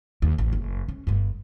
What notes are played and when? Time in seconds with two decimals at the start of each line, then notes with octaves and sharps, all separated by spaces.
0.22 D#2
0.38 A1
0.53 F#1
0.89 C#4
1.07 G1 G2